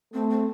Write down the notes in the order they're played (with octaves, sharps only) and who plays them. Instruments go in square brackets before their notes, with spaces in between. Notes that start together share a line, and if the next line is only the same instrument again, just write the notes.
[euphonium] A3 [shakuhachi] C4
[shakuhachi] C4